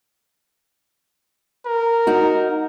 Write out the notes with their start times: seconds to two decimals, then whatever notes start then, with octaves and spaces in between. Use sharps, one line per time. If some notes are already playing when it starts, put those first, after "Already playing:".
1.66 A#4
2.07 D#4 F#4